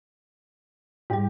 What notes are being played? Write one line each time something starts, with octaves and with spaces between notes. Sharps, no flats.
G#2 G3 E4 G4